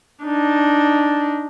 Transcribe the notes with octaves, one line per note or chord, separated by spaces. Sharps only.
D4 D#4